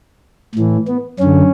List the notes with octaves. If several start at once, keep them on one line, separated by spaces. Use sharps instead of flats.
A2 E3
B3
F#2 D3 C#4